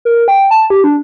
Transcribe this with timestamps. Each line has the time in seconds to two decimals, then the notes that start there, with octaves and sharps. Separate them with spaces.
0.05 A#4
0.28 G5
0.51 A5
0.70 G4
0.84 D4